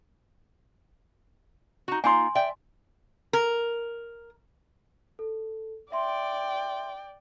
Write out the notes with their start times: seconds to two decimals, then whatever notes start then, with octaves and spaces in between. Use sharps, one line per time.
1.88 D#4 F#4
2.04 A#3 D#4 F4 G#5 C6
2.35 D5 E5 G5
3.33 A#4
5.19 A4
5.92 D5 E5 G5 C6